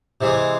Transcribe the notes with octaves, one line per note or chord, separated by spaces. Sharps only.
C3 E3 G#3